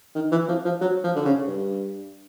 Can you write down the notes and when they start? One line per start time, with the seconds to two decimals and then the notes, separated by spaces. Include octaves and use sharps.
0.15 D#3
0.31 E3
0.48 F3
0.65 F3
0.81 F#3
1.04 F3
1.16 D3
1.25 C#3
1.47 G2